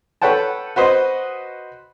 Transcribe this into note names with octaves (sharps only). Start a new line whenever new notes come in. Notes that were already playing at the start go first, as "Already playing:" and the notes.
A4 B4 C#5 F#5 G5 A5
F#4 B4 C5 D#5